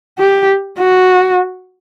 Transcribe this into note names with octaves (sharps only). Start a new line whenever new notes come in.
G4
F#4